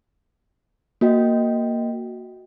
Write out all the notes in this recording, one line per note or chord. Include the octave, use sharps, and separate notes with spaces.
A#3 F#4 D#5 G5